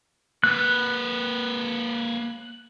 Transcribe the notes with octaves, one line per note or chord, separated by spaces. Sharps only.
A#3 B4 F#6